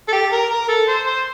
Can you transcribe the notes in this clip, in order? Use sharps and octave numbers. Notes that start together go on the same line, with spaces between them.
A4
G4
A#4
A#4
A4
C5
C5